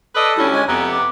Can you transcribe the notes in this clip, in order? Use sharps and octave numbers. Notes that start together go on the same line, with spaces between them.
A4 B4 D5 D#5 D#6
D2 G3 C#4 E4
G#3 C#5 G#5
F2 C3 B3 A#5
D6